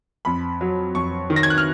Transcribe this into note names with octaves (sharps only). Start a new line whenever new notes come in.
F2 B5
F#3
F2 C#6
D#3
A#6
G#6
F#6
F6